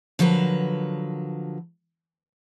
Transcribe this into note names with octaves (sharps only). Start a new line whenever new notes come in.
D3 F3 F#3 A#4 B4